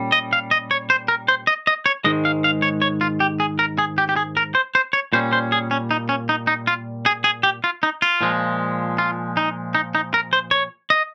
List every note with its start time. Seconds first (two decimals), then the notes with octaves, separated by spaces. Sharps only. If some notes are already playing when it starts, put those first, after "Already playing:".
Already playing: A#2 G3 C#4
0.12 D#5
0.33 F5
0.51 D#5
0.71 C#5
0.90 C5
1.08 A#4
1.28 C5
1.47 D#5
1.67 D#5
1.86 C#5
2.04 G#2 D#3 G#3 D#5
2.25 F5
2.44 F5
2.62 C#5
2.82 C#5
3.01 F4
3.20 G4
3.40 G#4
3.59 A#4
3.78 G#4
3.98 G4
4.09 G4
4.16 G#4
4.37 A#4
4.55 C5
4.75 C5
4.93 C#5
5.13 A#2 G3 C#4 C5
5.33 C5
5.52 G#4
5.71 C#4
5.91 D#4
6.09 C#4
6.29 D#4
6.47 D#4
6.67 F4
7.06 G#4
7.24 G#4
7.43 G4
7.64 F4
7.83 D#4
8.02 F4
8.21 A#2 F3 G#3
8.98 F4
9.37 D#4
9.75 D#4
9.95 D#4
10.14 A#4
10.33 C5
10.51 C#5
10.90 D#5